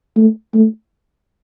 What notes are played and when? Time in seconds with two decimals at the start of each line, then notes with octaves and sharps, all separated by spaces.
0.16 A3
0.54 A3